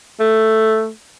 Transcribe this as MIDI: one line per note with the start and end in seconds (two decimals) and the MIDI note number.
0.20 0.90 57